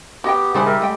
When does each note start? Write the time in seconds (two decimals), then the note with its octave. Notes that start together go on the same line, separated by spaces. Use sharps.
0.24 B3 F#4 G4 D#5 G5
0.54 C#3 G3 B3 D4 E4 G#4 C5
0.66 G3 G4 A#4 D#5 E5
0.82 G#3 A3 G5